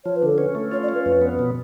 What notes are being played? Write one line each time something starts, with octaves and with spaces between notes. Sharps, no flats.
F3 C#5
B4
D3 A4
C#4 B4
A3
F4 C#5
D5
C#4
B4
F2 B4
B3
B2